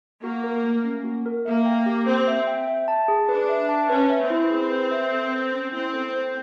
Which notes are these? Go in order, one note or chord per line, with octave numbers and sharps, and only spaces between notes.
A#3 F#4
A#4
A3
C#4
F#4
A#4
A#3 E5
G5
G4
C4 C5
E5
G5
E5
A5
G#4
D4 B4
E5
A5
C#4 B4
E5
C4
E4
G#4
B4
E5
A4
C5
C#4
C4 E4
A4
C5